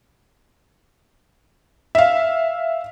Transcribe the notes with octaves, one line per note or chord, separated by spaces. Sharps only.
E5 F5